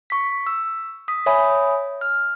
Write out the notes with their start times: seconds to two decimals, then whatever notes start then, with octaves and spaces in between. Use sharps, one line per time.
0.10 C#6 B6
0.47 E6
1.08 D#6 B6
1.26 C#5 E5 G#5 B5 D#6
2.01 F6